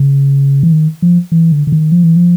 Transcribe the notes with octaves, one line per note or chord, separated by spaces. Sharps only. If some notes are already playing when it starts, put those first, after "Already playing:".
Already playing: C#3
E3
D#3
F3
E3
D3
D3
D#3
F3
E3
F3